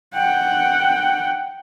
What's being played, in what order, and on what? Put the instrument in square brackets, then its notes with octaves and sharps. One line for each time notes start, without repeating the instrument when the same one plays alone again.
[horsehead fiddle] F#5 G5